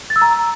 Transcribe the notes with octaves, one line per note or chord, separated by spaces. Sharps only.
A6
E6
A#5